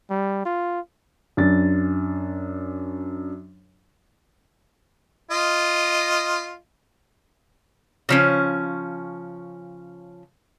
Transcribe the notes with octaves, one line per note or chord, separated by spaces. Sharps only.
G3
F4
F#2 D4 A6
F4 D#5
C#3 F3 C#4